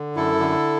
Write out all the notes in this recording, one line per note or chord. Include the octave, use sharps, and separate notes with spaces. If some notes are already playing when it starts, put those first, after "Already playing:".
Already playing: D3
F#2 E4 A4
D3